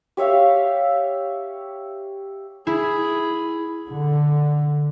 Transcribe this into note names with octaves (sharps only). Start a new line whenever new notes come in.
G4 C#5 E5 F5
E4 G#4 B5
D3